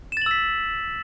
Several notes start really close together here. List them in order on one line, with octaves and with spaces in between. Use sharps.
E7 A6 F#7 E6 B6